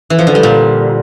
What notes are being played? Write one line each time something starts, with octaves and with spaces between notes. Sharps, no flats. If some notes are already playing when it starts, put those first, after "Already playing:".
E3
F3
D3
G3
A#2